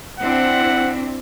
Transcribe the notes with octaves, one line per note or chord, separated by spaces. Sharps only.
C4 D4 E4 F#5